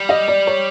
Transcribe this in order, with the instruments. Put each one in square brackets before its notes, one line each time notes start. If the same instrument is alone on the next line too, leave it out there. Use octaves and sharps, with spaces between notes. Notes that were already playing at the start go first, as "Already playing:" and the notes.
Already playing: [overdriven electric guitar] G3
[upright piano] D#5
D5
C#5